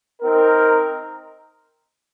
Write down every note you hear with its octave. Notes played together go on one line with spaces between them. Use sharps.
C4 D#4 A#4